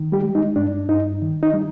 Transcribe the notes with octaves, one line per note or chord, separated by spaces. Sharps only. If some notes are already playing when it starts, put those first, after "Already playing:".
Already playing: D#3
G3 G4
G#3
D#4
G2 D4
G2 D#4
D#3
D#4
G3